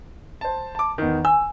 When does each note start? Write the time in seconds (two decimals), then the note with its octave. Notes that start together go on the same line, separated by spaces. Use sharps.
0.41 C5 A5
0.75 A5 D6
0.98 E2 D#3
1.25 G#5 E6